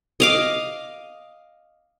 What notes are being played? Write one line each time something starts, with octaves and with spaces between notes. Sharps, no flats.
D#5 F5 D6